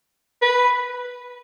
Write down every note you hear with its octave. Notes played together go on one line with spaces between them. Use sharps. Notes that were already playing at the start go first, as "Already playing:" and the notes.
B4